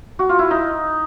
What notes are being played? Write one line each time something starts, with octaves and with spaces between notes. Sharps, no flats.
F#4
F4
E4
D#4